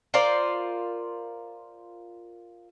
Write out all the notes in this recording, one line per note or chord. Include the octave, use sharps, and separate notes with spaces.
F4 A#4 C5 D5